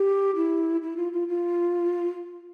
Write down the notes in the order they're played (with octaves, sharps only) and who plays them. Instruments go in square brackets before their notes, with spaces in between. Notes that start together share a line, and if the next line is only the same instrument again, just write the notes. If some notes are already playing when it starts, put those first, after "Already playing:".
Already playing: [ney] G4
E4
E4
F4
F4
F4